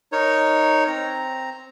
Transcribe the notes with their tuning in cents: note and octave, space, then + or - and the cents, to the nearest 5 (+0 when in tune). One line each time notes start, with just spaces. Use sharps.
D#4 +0 A#4 +0 C#5 +0
C4 +0 A#5 +0